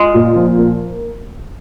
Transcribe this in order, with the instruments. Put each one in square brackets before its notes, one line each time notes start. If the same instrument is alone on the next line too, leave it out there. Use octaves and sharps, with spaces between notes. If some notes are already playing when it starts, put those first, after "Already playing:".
Already playing: [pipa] G#3 [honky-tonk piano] F4
[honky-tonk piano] A#2
F3
A#3